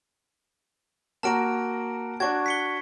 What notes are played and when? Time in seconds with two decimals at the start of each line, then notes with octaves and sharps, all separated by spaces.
1.23 A#3 F#4 A5 A#5 F6 D7
2.20 D4 F#4 C#6 G#6
2.46 B6 C#7 G7